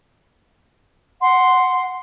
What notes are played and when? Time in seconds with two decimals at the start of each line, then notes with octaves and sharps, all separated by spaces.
1.21 F#5 C6